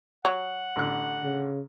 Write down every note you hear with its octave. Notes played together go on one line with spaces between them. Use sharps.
F#3 F#5
A1 D3 F#6
C#3